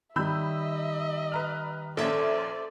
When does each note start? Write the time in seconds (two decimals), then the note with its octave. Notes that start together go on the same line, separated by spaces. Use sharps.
0.16 D#3 G3 D#5 E5 B5 E6 G6
1.32 B4 A#5 F6
1.97 A#1 A#3 C#4 A4 C5 D5 E5